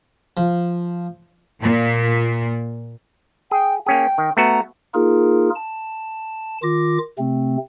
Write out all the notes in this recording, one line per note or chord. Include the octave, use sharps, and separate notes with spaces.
F3
A#2
G#4 G5
A#3 C#4 G#4 G5
D#3
A3 B3 F#4 A#5
A#3 D#4 F4 G#4 A#4
A5
D#3 F4 D6 A#6
C3 A3 C4